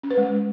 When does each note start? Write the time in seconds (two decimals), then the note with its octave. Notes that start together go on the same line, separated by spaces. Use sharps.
0.03 C#4
0.11 B4
0.18 G#3